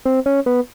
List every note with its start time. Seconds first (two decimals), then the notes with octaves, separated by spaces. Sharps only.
0.05 C4
0.26 C#4
0.46 B3